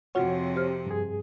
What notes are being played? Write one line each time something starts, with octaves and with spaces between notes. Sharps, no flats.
F2 C3 F4 F#4 C#5 F#5
G4 C5 F6
G2 G#4